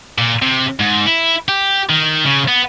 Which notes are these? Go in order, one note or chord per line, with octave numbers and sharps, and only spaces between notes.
A#2
C3
G#2
E4
G4
D#3
C#3
B3